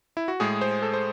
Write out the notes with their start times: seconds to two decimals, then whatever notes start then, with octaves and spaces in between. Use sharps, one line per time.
0.17 E4
0.28 F#4
0.40 A2 G#3 G#4
0.61 C5
0.82 A4
0.93 C5